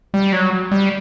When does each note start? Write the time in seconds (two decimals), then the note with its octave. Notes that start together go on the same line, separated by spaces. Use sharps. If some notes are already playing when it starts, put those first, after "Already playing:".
0.14 G3
0.32 F#3
0.72 G3